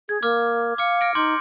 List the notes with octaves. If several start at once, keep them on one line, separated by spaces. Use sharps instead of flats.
G#4 G#6
A#3 D6 F6
F5 D6 F6 C#7
F6 A#6 D7
D#4 C6 D6 G6